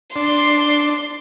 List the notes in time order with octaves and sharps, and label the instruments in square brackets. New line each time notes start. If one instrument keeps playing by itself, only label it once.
[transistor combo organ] D4 [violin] C6